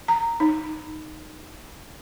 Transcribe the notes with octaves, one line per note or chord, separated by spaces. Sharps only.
A#5
D#4